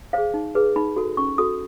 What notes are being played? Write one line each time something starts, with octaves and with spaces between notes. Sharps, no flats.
G#4 C5 F5
D#4
G#4 B4
D#4 B5
F#4 A4
C#4 C#6
F#4 A4 D#6